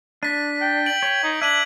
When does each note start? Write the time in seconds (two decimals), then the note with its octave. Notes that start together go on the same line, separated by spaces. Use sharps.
0.23 D4 B6 D#7
0.62 G5
0.86 D7 F#7
1.03 C#5
1.24 D#4
1.42 D4 E5 G#6 D#7 F#7